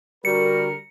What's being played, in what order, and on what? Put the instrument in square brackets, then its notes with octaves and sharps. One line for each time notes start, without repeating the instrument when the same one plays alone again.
[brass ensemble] D3 A#4 [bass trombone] G3 [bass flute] F#4 [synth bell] C#7